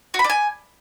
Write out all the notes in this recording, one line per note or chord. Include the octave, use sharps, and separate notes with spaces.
F#4
B5
D5
G#5